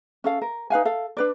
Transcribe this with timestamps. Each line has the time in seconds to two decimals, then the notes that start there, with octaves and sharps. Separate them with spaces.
0.24 C#4 A4 F5
0.42 A#4
0.70 D#4 B4 F5 G#5
0.85 A4 F5
1.17 D4 B4 D5